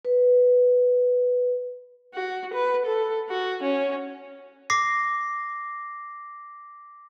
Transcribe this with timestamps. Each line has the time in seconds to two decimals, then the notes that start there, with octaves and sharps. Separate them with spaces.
0.05 B4
2.14 F#4
2.53 B4
2.86 A4
3.29 F#4
3.63 C#4
4.70 D6 A#6 C7